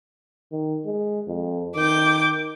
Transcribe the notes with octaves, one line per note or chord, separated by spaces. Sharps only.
D#3
G#3
F2
D#3 D6 G6